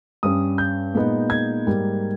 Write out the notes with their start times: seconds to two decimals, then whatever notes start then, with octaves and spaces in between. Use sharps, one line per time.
0.23 G2 G3 C#4 D#6
0.58 G6
0.94 A#2 G#3 B3 D#4
1.30 G#6
1.67 G#2 G3 A#3